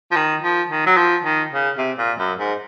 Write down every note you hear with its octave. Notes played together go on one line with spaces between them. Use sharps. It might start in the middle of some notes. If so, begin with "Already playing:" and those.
F3
D#3
F3
D#3
F#3
F3
D#3
C#3
C3
A#2
F#2
G#2